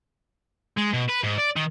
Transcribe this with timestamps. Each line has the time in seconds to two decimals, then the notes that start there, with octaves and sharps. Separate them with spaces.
0.78 G#3
0.94 B2
1.10 B4
1.24 G#2
1.38 D5
1.57 D#3